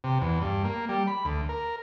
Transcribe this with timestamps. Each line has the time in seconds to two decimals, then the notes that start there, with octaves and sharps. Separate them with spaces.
0.04 C3
0.21 E2
0.41 G2
0.64 A#3
0.89 G3
1.07 B5
1.25 D2
1.49 A#4